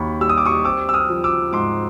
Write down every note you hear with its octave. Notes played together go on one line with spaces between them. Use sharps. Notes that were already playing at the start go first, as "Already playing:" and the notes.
Already playing: D#2 D#3 B5 C#6
G3 E6
D#6
D6
C#6 D#6
C4 D6 E6
E6
D#6 F6
F3
D6 E6
G#2 C6 D6